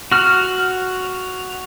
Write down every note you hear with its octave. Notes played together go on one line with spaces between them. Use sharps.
F#4 F6